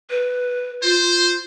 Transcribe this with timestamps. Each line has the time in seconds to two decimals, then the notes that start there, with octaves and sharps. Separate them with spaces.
0.10 B4
0.83 F4 C5